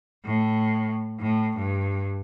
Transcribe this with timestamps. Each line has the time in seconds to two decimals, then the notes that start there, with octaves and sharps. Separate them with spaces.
0.25 A2
1.19 A2
1.56 G2